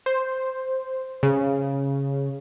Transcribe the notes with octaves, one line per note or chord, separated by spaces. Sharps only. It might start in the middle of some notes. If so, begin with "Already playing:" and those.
C5
C#3